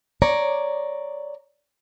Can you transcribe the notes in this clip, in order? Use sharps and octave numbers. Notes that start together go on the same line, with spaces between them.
C#5 D5 A#5